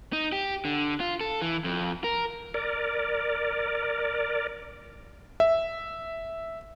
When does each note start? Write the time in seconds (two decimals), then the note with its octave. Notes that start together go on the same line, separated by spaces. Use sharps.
0.13 D#4
0.32 G4
0.65 D3
1.00 F4
1.21 A4
1.42 E3
1.64 F2
2.04 A#4
2.54 A#4 D5
5.40 E5